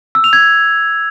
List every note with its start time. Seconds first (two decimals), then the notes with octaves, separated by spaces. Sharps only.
0.15 E6
0.24 F7
0.33 G#6